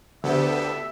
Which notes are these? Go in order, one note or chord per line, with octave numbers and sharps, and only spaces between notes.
D2 D3 B3 G4 A4 E5